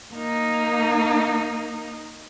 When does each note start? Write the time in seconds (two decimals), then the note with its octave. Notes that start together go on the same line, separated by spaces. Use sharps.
0.14 A#3 D#4